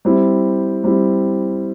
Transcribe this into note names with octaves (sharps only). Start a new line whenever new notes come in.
G3 C4 E4
G3 C4 E4